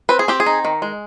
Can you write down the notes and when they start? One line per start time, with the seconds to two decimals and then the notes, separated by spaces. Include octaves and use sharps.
0.09 C4 B4
0.19 G#4
0.28 C4 G4
0.40 G#4
0.46 D#4
0.65 D#3
0.82 G#3